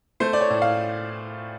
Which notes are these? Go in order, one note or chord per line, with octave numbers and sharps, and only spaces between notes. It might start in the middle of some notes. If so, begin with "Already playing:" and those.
A3 C5
D5
C#5
A2
F5